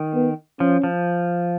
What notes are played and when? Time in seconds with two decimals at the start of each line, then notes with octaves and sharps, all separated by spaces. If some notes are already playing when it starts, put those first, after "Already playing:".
Already playing: D#3
0.14 B3
0.60 F3 C#4
0.84 F3